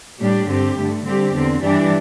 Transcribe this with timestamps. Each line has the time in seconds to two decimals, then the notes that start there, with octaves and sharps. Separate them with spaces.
0.20 A2 G3 D4 G4
0.48 G2 D3 C4 G4
0.76 G2 D3 A3
1.05 D3 G3 C4 G4
1.33 E2 D3 C4
1.61 G2 E3 G3 D4 G4